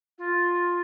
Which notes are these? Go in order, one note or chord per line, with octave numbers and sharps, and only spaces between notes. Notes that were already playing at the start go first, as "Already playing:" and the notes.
F4